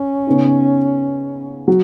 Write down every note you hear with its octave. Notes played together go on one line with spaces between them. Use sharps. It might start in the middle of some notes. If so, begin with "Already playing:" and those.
Already playing: C#4
C#3 B3 D#4
F#3